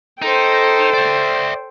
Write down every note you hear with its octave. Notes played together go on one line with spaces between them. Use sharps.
D#4 A4 C5 G5
D5 E5